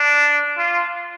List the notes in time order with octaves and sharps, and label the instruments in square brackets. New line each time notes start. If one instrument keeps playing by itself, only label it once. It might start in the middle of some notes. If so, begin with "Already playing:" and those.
Already playing: [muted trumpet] D4
F4